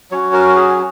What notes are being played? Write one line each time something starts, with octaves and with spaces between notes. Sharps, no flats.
F#3 C#4 F#4 C#5
A#4
G#4